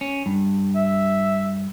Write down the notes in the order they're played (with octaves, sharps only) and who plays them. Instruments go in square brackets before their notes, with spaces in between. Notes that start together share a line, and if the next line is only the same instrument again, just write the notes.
[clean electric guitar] C#4
G2
[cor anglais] E5